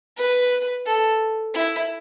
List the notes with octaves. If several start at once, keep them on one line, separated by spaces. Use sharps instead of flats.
B4
A4
E4